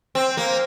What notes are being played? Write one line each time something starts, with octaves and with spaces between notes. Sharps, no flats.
C4
A#3